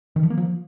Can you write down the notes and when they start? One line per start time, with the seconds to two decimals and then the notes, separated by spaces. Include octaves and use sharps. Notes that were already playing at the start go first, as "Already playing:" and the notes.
0.16 D#3
0.23 F3
0.30 A#3
0.37 F3